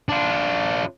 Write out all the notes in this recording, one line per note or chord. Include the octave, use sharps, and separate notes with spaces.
D4 F4